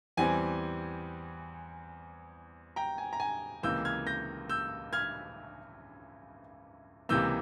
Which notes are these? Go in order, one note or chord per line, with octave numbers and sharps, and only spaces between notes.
E2 E3 G3 C4 G#5
G5 A#5
G#5
A#5
G#5
C#2 C3 E3 A#3 E6 G6
F6 G#6
G6 A#6
E6 G6
F6 G#6
C#2 C3 E3 A#3 E6 G6